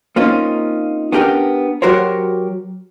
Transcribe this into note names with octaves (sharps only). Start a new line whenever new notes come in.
A#3 C4 C#4 D#4 F4
B3 C#4 D4 G4 A#4 G5
F#3 F#4 G4 A#4 C5 C#5